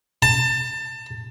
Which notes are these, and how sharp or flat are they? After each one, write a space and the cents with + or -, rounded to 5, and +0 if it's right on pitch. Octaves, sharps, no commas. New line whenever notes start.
A5 +25